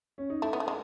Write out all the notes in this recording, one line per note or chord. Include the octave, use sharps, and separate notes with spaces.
C#4
D#4
A3 E4
B3
A3
G#3